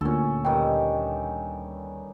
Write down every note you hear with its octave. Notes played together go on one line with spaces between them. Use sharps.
D2 A#2 C#4 A4
G2 D#3 G5